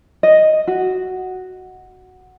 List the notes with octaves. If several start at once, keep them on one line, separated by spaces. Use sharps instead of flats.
D#5
F#4